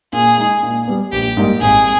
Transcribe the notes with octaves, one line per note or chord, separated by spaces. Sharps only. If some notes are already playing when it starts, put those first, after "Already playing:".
A#2 G#4
G#3 D#4
A#2
G3 B3
A#1 G4
G#2 G3 A#3 D#4
G#1 G#4